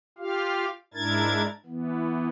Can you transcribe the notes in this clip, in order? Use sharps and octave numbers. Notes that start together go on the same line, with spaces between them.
F4 G4 F5
G#2 D4 E4 A#4 G#6 A6
E3 B3